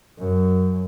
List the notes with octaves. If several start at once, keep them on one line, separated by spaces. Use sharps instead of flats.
F#2